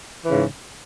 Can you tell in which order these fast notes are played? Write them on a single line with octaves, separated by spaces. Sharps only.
E3 C#3 G#2